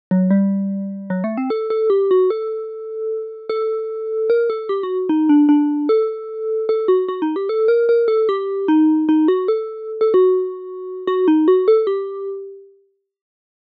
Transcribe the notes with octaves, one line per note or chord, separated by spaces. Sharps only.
F#3
G3
F#3
A3
C4
A4
A4
G4
F#4
A4
A4
A#4
A4
G4
F#4
D#4
D4
D4
A4
A4
F#4
F#4
D#4
G4
A4
A#4
A#4
A4
G4
D#4
D#4
F#4
A4
A4
F#4
F#4
D#4
F#4
A4
G4